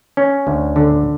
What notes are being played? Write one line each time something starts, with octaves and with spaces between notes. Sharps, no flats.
C#4
D2
D3